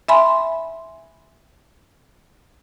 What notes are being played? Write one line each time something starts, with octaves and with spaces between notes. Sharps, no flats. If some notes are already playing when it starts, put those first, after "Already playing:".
E5 G#5 B5 C6